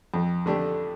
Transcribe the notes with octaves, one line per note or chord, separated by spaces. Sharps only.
F2
D3 A3 D4 G4